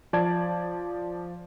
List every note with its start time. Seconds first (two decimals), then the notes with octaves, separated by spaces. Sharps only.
0.13 F3 D5 A5 G#6